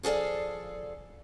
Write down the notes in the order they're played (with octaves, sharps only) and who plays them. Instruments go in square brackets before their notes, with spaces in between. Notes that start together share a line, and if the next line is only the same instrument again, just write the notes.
[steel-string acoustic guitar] F3 G#4 A4 D5 F5